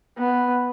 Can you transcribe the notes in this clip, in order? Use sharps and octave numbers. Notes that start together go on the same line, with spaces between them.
B3